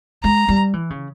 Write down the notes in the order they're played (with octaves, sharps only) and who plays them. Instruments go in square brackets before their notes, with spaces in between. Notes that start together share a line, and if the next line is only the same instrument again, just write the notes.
[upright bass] G#3 [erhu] A#5
[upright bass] G3
E3
C#3